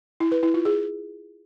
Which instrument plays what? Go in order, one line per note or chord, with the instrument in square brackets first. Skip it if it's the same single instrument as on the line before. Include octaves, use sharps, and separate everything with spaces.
[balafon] E4
B4
E4
F4
G#4